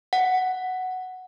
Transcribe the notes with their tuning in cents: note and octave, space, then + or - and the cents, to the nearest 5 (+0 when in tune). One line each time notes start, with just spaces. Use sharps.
F#5 +0